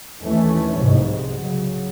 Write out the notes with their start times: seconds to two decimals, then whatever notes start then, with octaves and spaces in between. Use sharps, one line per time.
0.21 D#2 E3 A3 C#4
0.77 C2 F2 G#2 C3
1.28 C#3 F#3